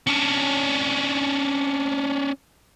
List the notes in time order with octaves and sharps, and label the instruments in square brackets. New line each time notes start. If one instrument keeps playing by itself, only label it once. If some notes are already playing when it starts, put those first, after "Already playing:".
[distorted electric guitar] C#4 D4